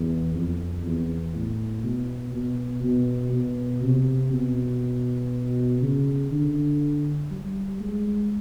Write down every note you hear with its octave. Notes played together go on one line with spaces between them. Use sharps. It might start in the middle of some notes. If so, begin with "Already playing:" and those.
Already playing: E2
F2
E2
A2
B2
B2
B2
B2
C3
B2
C#3
D3
G3
G#3